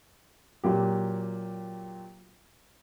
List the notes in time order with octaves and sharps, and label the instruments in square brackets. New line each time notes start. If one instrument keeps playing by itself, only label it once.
[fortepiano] A#2 F#3 G4